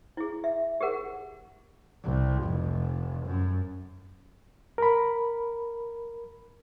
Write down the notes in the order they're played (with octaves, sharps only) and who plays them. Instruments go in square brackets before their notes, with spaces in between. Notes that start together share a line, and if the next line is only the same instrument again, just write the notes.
[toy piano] E4 G#4
E5
G4 G#4 A#4 F#5
[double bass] C2
F1
F#2
[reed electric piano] A#4 B5